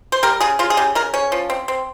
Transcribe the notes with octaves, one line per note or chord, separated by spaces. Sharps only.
C5
G3 A#4
C#3 G#4
C#3 F4
G#4
C#3 G4
C#3 A#4
C#4 C#5
F3
C4
C4